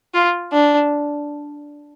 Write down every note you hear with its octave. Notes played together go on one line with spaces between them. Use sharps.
F4
D4